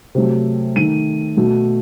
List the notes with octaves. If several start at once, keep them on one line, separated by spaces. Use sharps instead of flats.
C3 F#3 A3
D#3 A3 D#7
B2 A3